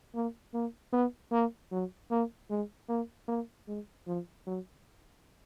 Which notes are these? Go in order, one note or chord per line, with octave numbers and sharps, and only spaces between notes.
A#3
A#3
B3
A#3
F#3
A#3
G#3
A#3
A#3
G#3
F3
F#3